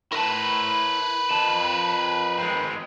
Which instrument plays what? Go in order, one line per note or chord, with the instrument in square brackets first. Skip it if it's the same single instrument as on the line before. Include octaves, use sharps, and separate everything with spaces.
[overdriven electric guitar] E4 A5 [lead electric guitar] A#4 B4
[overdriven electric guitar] F2 A5
G#3 C4